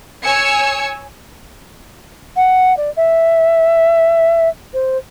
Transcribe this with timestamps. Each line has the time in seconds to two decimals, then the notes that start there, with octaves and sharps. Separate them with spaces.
0.21 C#5 G#5 E6 G#6 C#7
2.36 F#5
2.77 D5
2.97 E5
4.73 C5